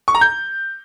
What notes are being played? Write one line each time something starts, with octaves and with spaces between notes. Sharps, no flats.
C#6
A#5
G6